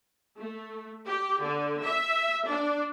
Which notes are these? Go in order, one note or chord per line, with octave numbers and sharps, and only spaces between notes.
A3
G4
D3
E5
D4